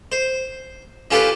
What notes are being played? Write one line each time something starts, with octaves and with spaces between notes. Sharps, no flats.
C5
C#4 F4 G4 A4 B4